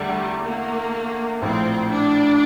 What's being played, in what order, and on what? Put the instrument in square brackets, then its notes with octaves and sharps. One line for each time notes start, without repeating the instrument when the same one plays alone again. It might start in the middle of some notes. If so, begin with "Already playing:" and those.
Already playing: [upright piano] E2 D3 A3 [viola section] G3
[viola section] A#3
[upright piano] A#1 A2 F3 [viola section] C4
[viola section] D4